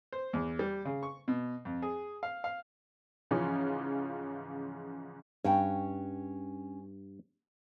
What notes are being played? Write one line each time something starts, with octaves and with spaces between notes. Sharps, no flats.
C5
E2
G3
C#3
C#6
B2
F2
G#4
F5
F5
G#2 C#3 E3 F3 C#4 F4
G2 C#4 F#4 G5